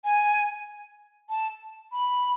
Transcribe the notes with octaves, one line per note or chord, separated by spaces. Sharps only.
G#5
A5
B5